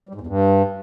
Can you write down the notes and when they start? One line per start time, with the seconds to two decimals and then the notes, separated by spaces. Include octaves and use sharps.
0.09 G3
0.15 G#2
0.21 E2
0.27 G2